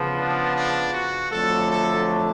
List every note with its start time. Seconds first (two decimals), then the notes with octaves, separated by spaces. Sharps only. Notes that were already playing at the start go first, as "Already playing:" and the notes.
Already playing: C#3 F3 B3
0.17 D4
0.55 D4
0.93 F#4
1.31 F2 D3 F#3 A3 A4
1.69 A4